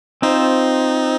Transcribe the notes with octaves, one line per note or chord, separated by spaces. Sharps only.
C4 D#4 F4 C5